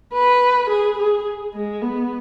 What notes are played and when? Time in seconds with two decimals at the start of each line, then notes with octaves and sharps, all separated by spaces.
0.14 B4
0.70 G#4
0.98 G#4
1.55 G#3
1.83 B3